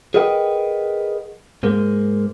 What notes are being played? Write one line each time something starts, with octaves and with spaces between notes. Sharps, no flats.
G#4 A#4 B4 D#5 F#5 G5
G#2 G#3 A#3